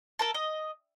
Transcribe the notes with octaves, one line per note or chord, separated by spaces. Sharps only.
A4 A#4 A5
D#5